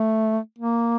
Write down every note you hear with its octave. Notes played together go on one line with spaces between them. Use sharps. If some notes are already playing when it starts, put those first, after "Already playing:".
Already playing: A3
A#3